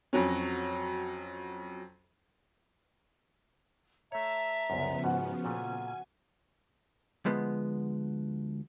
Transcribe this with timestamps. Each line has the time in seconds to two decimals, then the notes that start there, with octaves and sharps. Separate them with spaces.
0.13 F2 F#3 C#4
4.12 A3 C#5 E5 A5 A#5
4.70 C2 F#2 C#3 F3 B3
5.04 G#2 F#4 F6
5.45 A#2 A3 G#5
7.25 D2 F3 G#3 B3